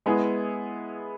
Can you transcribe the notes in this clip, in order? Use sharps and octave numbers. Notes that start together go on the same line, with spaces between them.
G#3 B3 E4 G#4